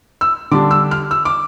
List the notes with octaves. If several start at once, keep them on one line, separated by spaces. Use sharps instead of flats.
E6
D3 G3 D4 D6
E6
F6
E6
D6